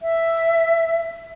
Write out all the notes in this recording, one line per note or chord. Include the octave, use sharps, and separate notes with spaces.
E5